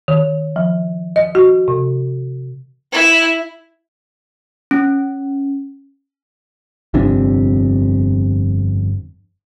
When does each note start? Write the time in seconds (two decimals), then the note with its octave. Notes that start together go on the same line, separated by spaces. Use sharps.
0.08 D#3
0.56 F3
1.16 D#5
1.35 F#4
1.68 C3
2.92 E4
4.71 C#4
6.94 G1 F2 C3 D4